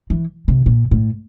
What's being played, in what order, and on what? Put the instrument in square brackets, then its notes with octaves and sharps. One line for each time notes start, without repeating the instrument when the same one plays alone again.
[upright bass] E3
C3
A#2
A2